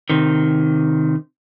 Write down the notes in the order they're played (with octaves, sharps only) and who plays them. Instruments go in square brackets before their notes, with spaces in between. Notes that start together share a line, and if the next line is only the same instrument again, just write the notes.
[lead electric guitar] C3 D#3